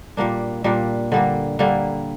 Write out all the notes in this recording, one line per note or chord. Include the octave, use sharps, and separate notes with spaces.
A#2 G3 A#3 D4
A#2 G3 A#3 D4
D3 G3 A#3
D3 G3 A#3